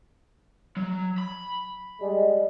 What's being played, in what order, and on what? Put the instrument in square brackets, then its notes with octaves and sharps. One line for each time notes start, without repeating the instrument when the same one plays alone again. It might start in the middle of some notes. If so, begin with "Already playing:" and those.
[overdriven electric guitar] F#3
B5
[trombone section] G3 G#3